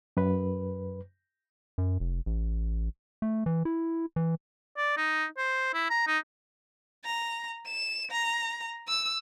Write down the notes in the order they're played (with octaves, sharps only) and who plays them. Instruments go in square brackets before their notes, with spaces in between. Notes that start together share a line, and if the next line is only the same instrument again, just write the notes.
[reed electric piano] F#2 B4
[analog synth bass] F#2
F1
A1
A3
E3
E4
E3
[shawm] D5
D#4
C5
E4
A#5
D#4
[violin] A#5
E7
A#5
E6